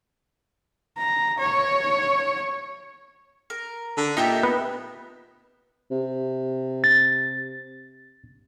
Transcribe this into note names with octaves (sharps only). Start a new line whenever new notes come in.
A#5
C#5
A#4
D3
A#2 D#4 G4 E5
B3
C3
A6